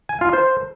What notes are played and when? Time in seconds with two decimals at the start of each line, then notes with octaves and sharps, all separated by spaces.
0.09 G#5
0.21 F4
0.33 C5